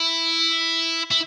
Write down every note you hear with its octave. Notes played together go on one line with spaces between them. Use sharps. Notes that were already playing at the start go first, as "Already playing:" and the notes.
Already playing: E4
E4